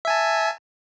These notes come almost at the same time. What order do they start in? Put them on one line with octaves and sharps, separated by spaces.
E5 G#5 A5